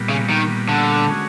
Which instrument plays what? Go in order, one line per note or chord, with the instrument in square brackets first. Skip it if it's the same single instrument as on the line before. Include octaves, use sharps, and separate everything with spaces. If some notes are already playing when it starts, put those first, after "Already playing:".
Already playing: [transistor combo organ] A#2 G3 B3
[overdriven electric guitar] C#3
D#3
D3
[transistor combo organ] G#3 C#4 F#4